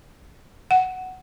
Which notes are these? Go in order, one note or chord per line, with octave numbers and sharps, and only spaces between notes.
F#5